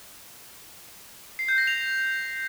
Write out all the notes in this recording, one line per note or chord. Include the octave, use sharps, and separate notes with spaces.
C7
G6
A#6
F7